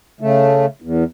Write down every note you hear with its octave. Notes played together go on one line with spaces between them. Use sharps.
C#3 A3
E2